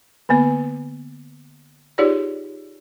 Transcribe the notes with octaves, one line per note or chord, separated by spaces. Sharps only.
D3 A#3 B3 B4
D#4 F4 G4 G#4 C#5 D5